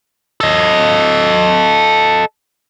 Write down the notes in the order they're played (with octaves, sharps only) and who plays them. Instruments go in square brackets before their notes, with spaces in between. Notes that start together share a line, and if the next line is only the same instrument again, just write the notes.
[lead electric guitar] A4 D#5